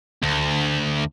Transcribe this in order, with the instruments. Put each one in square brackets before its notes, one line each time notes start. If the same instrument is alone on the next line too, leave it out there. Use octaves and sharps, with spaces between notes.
[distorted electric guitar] D2